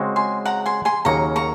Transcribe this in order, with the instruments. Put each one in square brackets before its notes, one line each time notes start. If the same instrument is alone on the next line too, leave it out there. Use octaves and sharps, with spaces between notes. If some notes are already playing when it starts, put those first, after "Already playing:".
Already playing: [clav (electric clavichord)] C#3 G#3 C4 F#4
[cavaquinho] G#5 C6
F#5 A#5
G#5 C6
G#5 C6
[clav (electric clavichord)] D#2 C#3 F#3 A#3 [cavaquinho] A#5 C#6
[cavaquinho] A#5 C#6